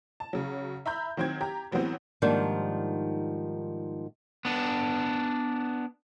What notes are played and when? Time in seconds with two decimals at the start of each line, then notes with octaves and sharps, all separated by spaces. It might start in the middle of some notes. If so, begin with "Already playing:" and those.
0.20 A5
0.33 C#3 F#3
0.86 E5 A#5 B5 G6
1.17 D#3 F#3 C4 G5 G#6
1.41 G4 A#5
1.71 A2 E3 F#3 G3 B3 C4
2.22 G#2 D#3 F3 G3 A#3 D4
4.45 B3 D4